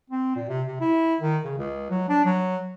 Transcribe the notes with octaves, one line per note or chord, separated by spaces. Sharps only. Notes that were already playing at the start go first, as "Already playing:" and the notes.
C4
A#2
C3
C3
E4
D#3
C#3
C#2
F#3
D4
F#3